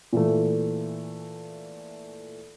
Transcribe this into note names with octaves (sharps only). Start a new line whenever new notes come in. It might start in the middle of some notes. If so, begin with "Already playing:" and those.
A#2 E3 A3